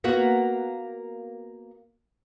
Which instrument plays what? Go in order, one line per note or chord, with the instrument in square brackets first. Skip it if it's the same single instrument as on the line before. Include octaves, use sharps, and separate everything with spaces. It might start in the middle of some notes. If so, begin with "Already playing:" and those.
[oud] A#3 B3 F#4